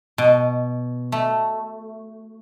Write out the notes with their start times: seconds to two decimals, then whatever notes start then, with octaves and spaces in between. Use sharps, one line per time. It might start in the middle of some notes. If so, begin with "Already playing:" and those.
0.18 B2
1.12 A3